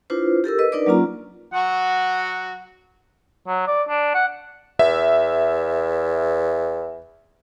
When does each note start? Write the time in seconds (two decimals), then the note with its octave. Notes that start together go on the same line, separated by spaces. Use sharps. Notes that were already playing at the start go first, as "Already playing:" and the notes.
0.10 D4 E4 F4 B4 C5
0.44 G4 A4 A#4 E6
0.59 B4 D#5
0.72 D4 D#4 A#4 B4 D5 D6
0.86 F#3 A#3 C#4 F4 A#5
1.53 F#3 F#4 F#5
3.47 F#3
3.67 D5
3.89 D4
4.14 F#5
4.79 E2 E5